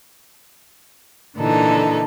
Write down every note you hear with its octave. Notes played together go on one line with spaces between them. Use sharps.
A#2 D3 E3 D#4 A4